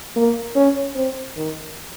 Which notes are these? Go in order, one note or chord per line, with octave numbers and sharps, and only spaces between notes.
A#3
C#4
C4
D#3